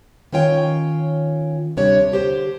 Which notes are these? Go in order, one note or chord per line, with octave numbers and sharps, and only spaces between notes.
D#3 C#4 F4 C#5 G5
D2 C3 G3 D4 C#5
D3 G4 C5